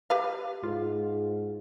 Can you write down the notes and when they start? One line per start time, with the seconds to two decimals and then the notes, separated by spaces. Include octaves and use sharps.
0.10 G4 B4 F5
0.63 G#2 F4